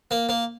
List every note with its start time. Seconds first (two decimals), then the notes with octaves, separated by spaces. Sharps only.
0.11 A#3
0.29 A#3